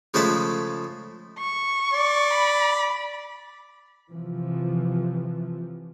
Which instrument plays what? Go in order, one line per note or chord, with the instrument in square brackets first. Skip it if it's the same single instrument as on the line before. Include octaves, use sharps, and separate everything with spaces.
[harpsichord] C#3 F3 G#3 A3 A5 B5
[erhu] C#6
[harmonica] D5
[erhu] B5
[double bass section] C3 E3 F3